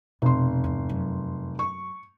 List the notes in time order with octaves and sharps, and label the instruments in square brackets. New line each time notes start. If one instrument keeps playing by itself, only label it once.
[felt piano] F1 C6 [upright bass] B2 B3
[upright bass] E2 G2
F#2
[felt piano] C#6